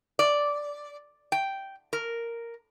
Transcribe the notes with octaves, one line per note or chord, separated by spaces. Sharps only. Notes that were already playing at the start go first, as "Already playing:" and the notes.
D5
G5
A#4